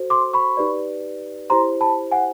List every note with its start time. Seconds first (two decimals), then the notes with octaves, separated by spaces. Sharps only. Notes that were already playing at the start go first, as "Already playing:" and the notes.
Already playing: F#4 A4 C5
0.10 C6 D6
0.33 B5 C#6
0.57 D#4 G4 B4 D5
1.50 E4 G4 C5 A#5 C6
1.81 A5 B5
2.12 F#5 G#5